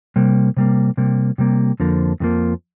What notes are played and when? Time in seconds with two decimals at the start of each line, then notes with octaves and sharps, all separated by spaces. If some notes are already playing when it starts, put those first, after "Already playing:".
0.16 C3 G3 A#3
0.57 C3 G3 A#3
0.97 C3 G3 A#3
1.38 C3 G3 A#3
1.80 F2 D3 F3 A#3
2.20 F2 D3 F3 A#3